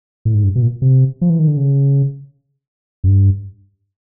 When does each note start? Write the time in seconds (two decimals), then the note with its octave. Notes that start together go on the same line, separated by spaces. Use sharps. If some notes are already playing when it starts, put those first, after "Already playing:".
0.25 A2
0.34 G#2
0.44 G2
0.55 B2
0.62 A#2
0.82 C3
1.21 F3
1.30 E3
1.39 D#3
1.48 D3
1.57 C#3
3.04 F#2
3.08 G2